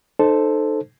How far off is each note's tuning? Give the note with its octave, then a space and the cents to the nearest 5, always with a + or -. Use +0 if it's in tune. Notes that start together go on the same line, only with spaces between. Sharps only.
D#4 -30 A4 +0 C5 +0